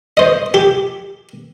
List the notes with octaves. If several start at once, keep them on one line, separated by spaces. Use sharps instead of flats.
C5 D#5
G4